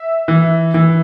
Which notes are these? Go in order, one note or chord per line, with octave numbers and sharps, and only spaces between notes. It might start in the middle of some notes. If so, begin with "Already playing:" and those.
Already playing: E5
E3
E3